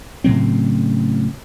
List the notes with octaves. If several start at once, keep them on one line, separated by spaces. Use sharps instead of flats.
A2 C#3 F#3 C4